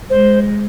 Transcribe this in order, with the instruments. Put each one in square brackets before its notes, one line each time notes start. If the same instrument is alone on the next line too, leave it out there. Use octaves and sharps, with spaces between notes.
[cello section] G#3 [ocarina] C5